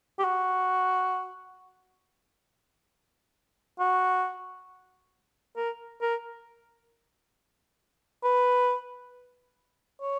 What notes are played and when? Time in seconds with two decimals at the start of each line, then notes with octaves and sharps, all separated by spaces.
0.19 G4
0.24 F#4
3.80 F#4
5.57 A#4
6.02 A#4
8.24 B4
10.01 C#5